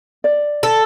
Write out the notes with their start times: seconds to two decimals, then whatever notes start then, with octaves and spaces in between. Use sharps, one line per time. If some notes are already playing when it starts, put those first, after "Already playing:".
0.24 D5
0.63 A4